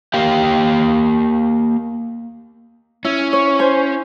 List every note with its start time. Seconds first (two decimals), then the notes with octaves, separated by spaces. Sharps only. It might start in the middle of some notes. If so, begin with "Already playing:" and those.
0.14 A#3 G4 F5 G5
3.05 C#4 E4
3.33 C#5
3.59 C5 G#5 G6